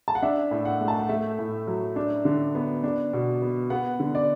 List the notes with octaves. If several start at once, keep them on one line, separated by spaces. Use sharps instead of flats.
A5
F#5
D4 E5
A2
F#5
A3
A5
F#5
A3 E5
A2
F#3
D4
D3
B3
D4
B2
B3
B3 F#5
D3
D5